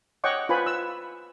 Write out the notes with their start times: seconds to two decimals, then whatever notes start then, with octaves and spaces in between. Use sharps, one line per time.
0.24 C#5 D#5 F#5 G5 C#6 D6
0.49 F4 B4 C5 G#5 B5
0.66 E6